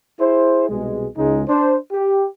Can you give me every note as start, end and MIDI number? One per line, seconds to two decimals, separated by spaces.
0.19 0.68 64
0.19 0.68 68
0.19 0.68 72
0.70 1.08 36
0.70 1.08 47
0.70 1.08 56
1.17 1.44 37
1.17 1.44 49
1.17 1.44 56
1.17 1.44 63
1.49 1.76 62
1.49 1.76 72
1.92 2.27 67